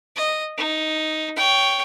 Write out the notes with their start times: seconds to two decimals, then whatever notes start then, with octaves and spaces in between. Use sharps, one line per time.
0.16 D#5
0.58 D#4
1.36 C#5 G5